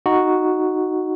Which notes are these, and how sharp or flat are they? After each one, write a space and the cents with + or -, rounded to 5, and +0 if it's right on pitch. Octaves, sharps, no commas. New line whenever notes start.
D#4 +0 F#4 +0